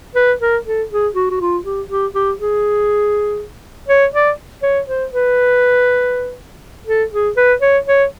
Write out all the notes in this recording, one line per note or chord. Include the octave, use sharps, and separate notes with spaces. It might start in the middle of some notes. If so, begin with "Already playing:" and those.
B4
A#4
A4
G#4
F#4
F#4
F4
G4
G4
G4
G#4
C#5
D5
C#5
C5
B4
A4
G#4
B4
C#5
C#5